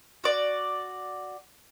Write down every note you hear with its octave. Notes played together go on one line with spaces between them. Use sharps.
F#4 D5